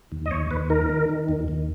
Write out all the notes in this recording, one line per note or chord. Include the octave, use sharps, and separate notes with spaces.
D#2
D#5
D#2 C#5
D#2 B4
D#3 A#4
D#3
D#3
D#2
D#2